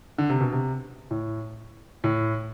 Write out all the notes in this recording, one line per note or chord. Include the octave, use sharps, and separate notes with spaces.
D3
C3
B2
C3
A2
A2